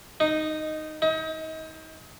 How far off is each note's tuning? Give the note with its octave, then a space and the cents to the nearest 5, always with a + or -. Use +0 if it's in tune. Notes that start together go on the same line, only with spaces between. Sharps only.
D#4 -5
D#4 +35